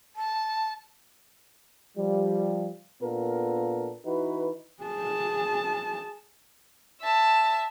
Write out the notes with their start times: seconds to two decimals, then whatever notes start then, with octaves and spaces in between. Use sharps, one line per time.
0.16 A5
1.97 F3 G3
3.01 A#2 B3 D4 F4 A4 A#4
4.05 E3 D#4 E4 F#4 B4
4.83 G#4 A5
7.01 E5 A5